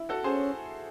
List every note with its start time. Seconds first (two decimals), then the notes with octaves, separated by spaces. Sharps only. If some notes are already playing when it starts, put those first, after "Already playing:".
Already playing: E4
0.09 F#4 A4
0.23 C#4 G#4 C5